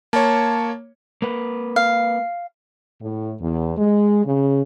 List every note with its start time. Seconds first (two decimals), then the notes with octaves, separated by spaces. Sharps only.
0.13 A#3 C#5 A5
1.22 A#3 B4
1.76 F5
3.01 A2
3.40 E2
3.77 G#3
4.25 C#3